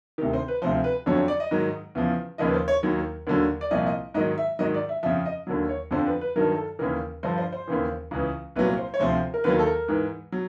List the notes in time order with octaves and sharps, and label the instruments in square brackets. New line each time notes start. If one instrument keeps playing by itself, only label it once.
[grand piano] D2 C3 D#3 G4
C5
B4
D2 C3 F3 C5
B4
F2 D3 F#3 C#5
C#5
D5
D#5
G#2 D#3 F#3
E2 C#3 F3
D#2 C#3 F3 D#5
B4
C5
C#5
D#2 D#3 F#3
D#2 D3 F#3
D5
C2 A#2 F3 D#5
D#5
G#2 D#3 F#3 D#5
E5
G#2 D#3 F#3 D#5
D5
E5
F2 C#3 F3 E5
D#5
D#2 D3 F#3
C#5
F2 D3 F3 C5
B4
B4
G2 D#3 F#3 A#4
A4
D#2 C#3 E3 A#4
G2 D3 F3 C5
C5
C5
D#2 C#3 E3
C#2 C#3 E3
C2 A#2 F#3 B4
C5
C#5
D2 C3 F3 C5
A#4
D#2 D#3 F#3 B4
A4
A#4
G#2 E3
F#3